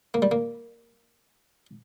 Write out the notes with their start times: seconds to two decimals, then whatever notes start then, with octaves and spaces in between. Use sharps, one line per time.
0.14 A#3
0.22 G3
0.31 A#3